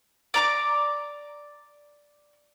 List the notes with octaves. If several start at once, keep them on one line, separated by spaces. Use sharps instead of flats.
D5 A#5 D6